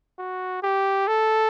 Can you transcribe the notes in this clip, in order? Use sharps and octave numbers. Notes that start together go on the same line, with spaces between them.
F#4
G4
A4